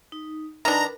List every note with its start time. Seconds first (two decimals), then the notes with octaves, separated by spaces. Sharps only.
0.12 D#4
0.65 D#3 D4 A#4 B4 A#5 B5